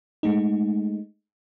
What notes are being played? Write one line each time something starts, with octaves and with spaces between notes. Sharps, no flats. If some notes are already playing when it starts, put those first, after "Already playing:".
G#3 A3 D#4